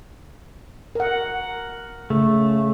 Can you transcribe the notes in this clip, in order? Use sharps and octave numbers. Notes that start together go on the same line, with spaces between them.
A#4 F#5
C#3 A3